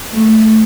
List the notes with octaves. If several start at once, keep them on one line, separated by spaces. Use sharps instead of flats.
A3